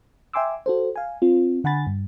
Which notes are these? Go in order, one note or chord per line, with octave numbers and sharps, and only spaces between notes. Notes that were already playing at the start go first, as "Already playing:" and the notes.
E5 G5 G#5 C6 D6 E6
F#4 A4 C5
F5 G#5
C4 F4
D3 F#5 G#5 B5 A6
G2